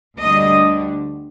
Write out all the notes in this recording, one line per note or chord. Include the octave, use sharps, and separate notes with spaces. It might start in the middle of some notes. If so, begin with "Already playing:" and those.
D2 D3 G3 D4 D#5